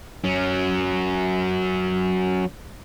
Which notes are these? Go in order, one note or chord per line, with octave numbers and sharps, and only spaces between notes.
F#3 C#4